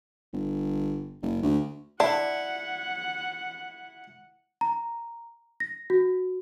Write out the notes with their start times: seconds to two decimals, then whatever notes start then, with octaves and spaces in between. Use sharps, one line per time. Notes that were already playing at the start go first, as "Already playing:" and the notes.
0.33 G1
1.22 F#1
1.43 D2
2.00 D4 E4 F#5
4.61 A#5
5.60 A#6
5.90 F#4